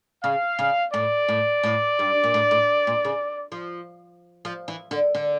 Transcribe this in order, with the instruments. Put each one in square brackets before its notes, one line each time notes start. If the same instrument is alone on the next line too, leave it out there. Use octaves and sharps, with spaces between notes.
[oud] C#3 [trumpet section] F5
[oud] C#3
[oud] A2 [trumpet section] D5
[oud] A2
A2
G2
A#2
A2
A2
A#2
C#3
F3
F3
E3
D3
D3